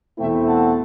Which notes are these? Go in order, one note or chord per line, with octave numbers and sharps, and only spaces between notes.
E2 B2 A3 C4 E4 E5 G5
F#5 A5